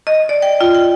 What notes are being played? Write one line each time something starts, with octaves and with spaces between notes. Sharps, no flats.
D#5
D5
G5
F4
G5